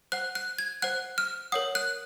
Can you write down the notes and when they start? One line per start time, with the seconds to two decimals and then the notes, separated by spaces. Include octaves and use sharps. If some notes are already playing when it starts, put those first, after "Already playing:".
0.12 C5 F#5 F#6
0.35 F#6
0.59 G#6
0.82 C5 F#5 F#6
1.18 F6
1.52 A#4 C#5 F#5 D#6
1.75 F#6